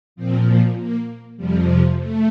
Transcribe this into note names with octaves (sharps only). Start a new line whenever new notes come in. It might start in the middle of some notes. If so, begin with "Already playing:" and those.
A#2 F3 C4
A#3
F2 C3 F3 G3
A3